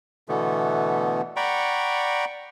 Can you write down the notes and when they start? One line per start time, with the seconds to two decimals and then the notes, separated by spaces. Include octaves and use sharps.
0.29 B2 D3 E3 A3 B3
1.36 D5 F#5 G5 A#5 B5 C#6